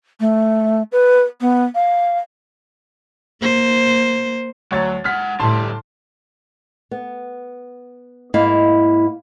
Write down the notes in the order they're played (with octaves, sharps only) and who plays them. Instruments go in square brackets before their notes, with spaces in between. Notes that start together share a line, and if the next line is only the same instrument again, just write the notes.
[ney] A3
B4
B3
F5
[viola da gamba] A#3 C5
[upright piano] D2 C#5 A6 [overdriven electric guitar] F#3
[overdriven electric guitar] G#3 F#5 [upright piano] F6 B6
[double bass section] A2 [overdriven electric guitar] D3 G3 [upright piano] A5 C6
[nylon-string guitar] B3
G#2 A#3 E4 D#5 F5